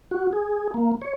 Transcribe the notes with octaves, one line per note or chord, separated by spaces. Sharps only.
F#4
G#4
A#3
C#5